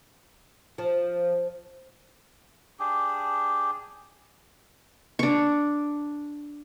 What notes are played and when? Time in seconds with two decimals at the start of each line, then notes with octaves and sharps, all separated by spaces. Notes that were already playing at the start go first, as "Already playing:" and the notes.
0.78 F3
2.79 D4 G4 G#4
5.19 D4 C#6